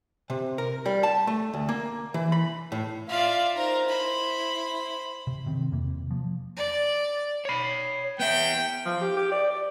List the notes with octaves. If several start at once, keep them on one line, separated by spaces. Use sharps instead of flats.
C3
A#4
G3
A5
A3
D2
A#3
E3
B5
A2
F4 D5 E5 F5
D#4 A#4 C5 A#5
E4 C5 B5
C3
C3 D#3 C4
E2 C3 A#3
F3 A#3
D5
C#5 B5
B3 E5 G5
F3
G4
G4
D5
D5